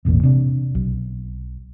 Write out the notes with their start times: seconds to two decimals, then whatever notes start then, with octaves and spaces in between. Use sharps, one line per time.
0.05 E1 A1 E2 A#2
0.23 C3 D4
0.75 B1